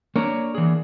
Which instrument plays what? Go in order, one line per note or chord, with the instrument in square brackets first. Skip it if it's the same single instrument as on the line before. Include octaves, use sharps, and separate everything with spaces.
[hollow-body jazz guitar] A#3 D4 [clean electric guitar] C#5 A#5
[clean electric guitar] E3 G#4